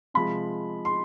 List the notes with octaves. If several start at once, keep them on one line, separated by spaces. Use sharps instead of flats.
C3 F3 G#3 B5
C6